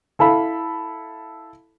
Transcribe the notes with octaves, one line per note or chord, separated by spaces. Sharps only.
E4 A4 F5 B5